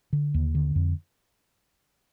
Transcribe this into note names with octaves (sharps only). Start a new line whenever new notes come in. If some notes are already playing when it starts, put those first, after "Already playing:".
D3
D#2
D3
F2